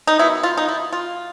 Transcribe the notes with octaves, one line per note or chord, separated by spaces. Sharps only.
D#4
D#3 F#3 B3 E4
F4
D#4
E4
F4